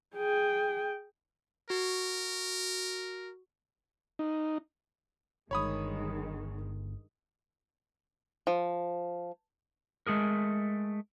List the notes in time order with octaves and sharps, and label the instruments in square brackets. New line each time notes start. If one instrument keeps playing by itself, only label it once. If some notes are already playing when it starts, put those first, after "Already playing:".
[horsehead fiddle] G#4 G5
[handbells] F#4 [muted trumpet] A#4
[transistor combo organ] D#4
[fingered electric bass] G1 [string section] G2 D#3 G#3 [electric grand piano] C#5 B5 D#6
[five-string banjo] F3
[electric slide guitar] G#3 A3 G#4 A#4